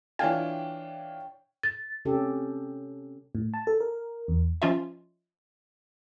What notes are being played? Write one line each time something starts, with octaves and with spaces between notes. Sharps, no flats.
E3 D4 F4 C#5 G5 G#5
A6
C3 C#4 G4 A4
A2
A5
A4
A#4
E2
F3 C#4 F4 C#5 D#5 E5